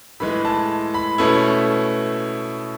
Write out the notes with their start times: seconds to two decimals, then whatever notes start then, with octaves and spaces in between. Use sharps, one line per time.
0.20 A2 E3 G#3 B5
0.45 A5
0.94 B5
1.18 B2 A3 C#4 E4